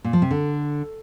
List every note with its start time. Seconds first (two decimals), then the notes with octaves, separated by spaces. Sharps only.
0.04 A#2
0.13 F3
0.22 C3
0.31 D3